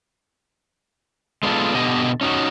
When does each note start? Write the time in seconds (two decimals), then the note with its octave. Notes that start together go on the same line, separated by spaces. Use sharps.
1.43 G#3 B3 D4 E4 F4 A4
1.75 B2 D3 B3 G4 D#5
2.21 C#4 D#4 F#4